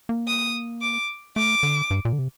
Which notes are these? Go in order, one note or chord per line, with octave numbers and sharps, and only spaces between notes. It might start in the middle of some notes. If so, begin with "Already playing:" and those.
A#3
D#6
D6
A3 D6
D3
G2
A#2
D3
C3